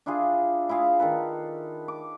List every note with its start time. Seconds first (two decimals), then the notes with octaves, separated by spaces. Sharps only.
0.06 D4 E4 F4 G#4
0.69 E4 F4 G#4 F5
0.99 D#3 A4 B4
1.88 D6